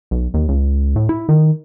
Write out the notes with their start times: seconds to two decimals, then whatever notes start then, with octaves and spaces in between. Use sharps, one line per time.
0.11 B1
0.34 D#2
0.48 C#2
0.96 A2
1.09 E4
1.29 D#3